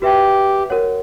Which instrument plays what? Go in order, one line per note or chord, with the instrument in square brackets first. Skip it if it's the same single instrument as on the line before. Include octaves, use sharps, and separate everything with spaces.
[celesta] F#4 B4 E5 G5 [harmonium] G4
[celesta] F#4 A#4 C#5 F#5